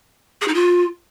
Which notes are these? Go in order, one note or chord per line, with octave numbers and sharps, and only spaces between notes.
G#4
D#4
F4